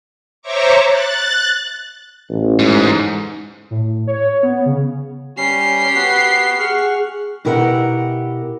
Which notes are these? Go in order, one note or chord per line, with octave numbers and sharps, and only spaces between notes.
C5 C#5 E5 A#5 C#6 D6
F#6 A6
A1
G#2
A2
C#5
B3
C#3
G3 C#4 G4 C7
B3 F#4
G#4 F#5 C#6 F6
B2 E4 G4 A#4 E5 F#5